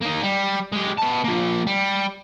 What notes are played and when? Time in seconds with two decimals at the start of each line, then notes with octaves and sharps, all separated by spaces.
0.01 A#3 D#4
0.22 G3
0.72 G#3 G4
0.97 B3 A5
1.24 F3 A#3
1.67 G3